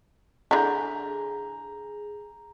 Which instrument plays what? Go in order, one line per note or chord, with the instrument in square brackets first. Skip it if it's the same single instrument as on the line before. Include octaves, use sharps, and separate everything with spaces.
[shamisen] D3 E4 [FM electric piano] G#4 [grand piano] A#5 G6